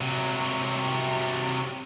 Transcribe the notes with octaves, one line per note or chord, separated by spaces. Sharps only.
C3 F#3